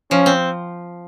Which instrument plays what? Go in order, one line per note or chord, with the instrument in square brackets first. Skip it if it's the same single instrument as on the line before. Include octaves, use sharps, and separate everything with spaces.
[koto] F3 [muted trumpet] C#4
[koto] C4